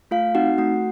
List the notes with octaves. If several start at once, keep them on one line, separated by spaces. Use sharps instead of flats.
A3 F4 F5
C4 D#4 F#4 F#5
A3 F#4 F#5